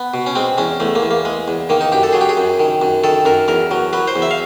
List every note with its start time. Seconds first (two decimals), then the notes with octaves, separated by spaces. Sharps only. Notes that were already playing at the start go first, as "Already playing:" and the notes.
Already playing: B3
0.14 B2
0.26 C#4
0.35 G#3 C4
0.58 E2 C#4
0.80 E2 A3
0.95 A#3
1.02 E2
1.11 A#3
1.25 G#3
1.48 E2
1.69 D#3 A#3
1.81 D#4
1.92 F#2 G4
2.03 A4
2.12 F#3 G#4
2.21 G4
2.29 G#4
2.37 F#2
2.59 D#3
2.82 F#2
3.04 D#3 A4
3.25 F#2 A#4
3.48 E2 A#4
3.71 F#3
3.93 F#3 B4
4.08 C5
4.16 E2
4.22 E5
4.31 F5